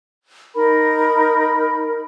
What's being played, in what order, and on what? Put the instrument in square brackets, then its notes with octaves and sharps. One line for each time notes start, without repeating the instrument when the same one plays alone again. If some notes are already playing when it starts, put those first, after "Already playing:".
[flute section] D#4 A#4 B5